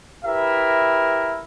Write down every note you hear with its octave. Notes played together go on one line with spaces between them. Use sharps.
E4 G4 A#4 B4 E5